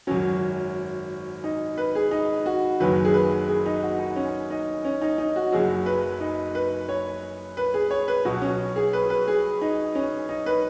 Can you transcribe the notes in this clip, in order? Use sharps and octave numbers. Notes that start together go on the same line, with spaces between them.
G#1 F#2 F#3 C#4
D#4
B4
G#4
D#4
F#4
F#1 F#2 D#3 F#3 B4
G#4
B4
G#4
D#4
F#4
D#4
C#4
D#4
C#4
D#4
D#4
F#4
F#1 F#2 F#3 G#4
B4
D#4
B4
C#5
B4
G#4
C#5
B4
B1 B2 F#3 F#4
C#4
G#4
B4
B4
G#4
D#4
C#4
D#4
B4